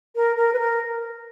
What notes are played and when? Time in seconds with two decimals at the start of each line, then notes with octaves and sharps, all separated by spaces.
0.16 A#4
0.37 A#4
0.53 B4
0.59 A#4